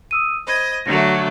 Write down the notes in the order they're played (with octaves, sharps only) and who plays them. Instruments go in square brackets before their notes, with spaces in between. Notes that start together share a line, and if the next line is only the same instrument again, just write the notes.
[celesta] D#6 E6 D#7
[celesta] C5 B5 G#6 [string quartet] D#5
[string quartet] D3 F#3 A3 [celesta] A#6